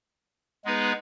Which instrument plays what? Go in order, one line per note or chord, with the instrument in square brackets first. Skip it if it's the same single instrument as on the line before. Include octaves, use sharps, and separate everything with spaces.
[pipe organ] G#3 B3 D#4 G#4 B4